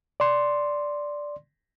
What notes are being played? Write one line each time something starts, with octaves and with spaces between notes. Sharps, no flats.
D5 C6